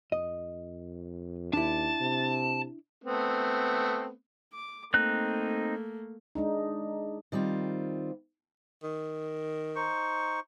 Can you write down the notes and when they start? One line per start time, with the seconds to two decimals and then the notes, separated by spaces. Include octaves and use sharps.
0.12 F2 D#5
1.53 D#2 D4 E4 A5
2.01 C3
3.04 A3 B3 C4
4.53 D6
4.94 A3 A#3 C4 D#4 F#6
6.35 G#3 D4 D#4
7.32 D#3 G3 C4 F4
8.83 D#3
9.76 D#4 C5 C#6